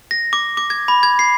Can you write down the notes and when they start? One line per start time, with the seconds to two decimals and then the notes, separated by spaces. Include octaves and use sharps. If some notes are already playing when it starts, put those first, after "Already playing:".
0.11 A#6
0.33 D6
0.57 D6
0.70 G#6
0.88 B5
1.03 G#6
1.19 C7